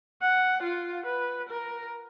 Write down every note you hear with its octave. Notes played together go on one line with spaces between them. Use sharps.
F#5
F4
B4
A#4